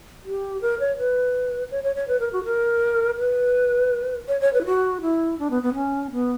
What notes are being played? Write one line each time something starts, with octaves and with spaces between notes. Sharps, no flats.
G4
A#4
C#5
B4
C#5
C#5
C#5
B4
A#4
F#4
A#4
B4
C#5
C#5
B4
E4
F#4
E4
D4
B3
B3
C#4
B3